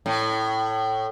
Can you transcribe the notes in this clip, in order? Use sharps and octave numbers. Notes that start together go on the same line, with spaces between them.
A2